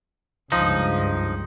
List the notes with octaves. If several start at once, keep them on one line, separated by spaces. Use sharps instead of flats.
C#2 G2 F3 D#4